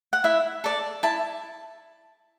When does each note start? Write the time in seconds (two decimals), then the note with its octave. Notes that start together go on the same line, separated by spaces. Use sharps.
0.13 F#5
0.24 E4 E5
0.64 A4 D5
1.03 E4 A5